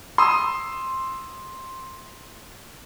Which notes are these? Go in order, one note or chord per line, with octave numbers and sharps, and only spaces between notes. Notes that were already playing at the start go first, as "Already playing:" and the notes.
C6 D#6 E6